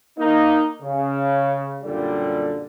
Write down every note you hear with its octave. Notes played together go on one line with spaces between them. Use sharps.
A#3 D#4
C#3
F#2 A#2 D3 G3